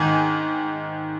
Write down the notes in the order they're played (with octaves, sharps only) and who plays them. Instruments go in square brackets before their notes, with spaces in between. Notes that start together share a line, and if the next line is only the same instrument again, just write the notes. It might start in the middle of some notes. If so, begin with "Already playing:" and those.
Already playing: [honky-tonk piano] G#2 D#3 G#5